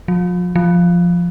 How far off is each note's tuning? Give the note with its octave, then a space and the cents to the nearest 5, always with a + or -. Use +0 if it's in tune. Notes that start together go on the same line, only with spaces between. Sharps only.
F3 +35
F3 +0